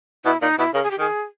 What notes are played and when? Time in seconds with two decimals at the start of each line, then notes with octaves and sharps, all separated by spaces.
0.25 B2 E4
0.41 A#2 D#4
0.58 B2 E4
0.74 C#3 A#4
0.83 G#4
0.91 G4
0.99 D#3 G#4